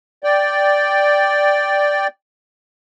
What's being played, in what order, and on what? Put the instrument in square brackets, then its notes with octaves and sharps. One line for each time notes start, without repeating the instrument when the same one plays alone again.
[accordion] D5 G5